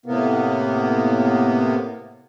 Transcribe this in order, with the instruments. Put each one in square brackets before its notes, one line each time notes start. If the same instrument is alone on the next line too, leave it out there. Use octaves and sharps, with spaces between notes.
[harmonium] A2 C3 A#3 B3